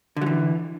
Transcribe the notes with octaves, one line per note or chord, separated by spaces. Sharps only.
D3 E3 F#3